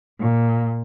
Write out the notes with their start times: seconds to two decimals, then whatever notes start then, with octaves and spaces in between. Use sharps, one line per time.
0.20 A#2